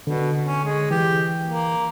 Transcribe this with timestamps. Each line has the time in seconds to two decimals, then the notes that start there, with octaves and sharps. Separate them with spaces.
0.07 B2 D3
0.45 C#4
0.64 G#3
0.91 E3 G4
1.46 A#3